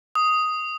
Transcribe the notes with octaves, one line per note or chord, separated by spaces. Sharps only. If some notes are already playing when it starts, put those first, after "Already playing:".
D#6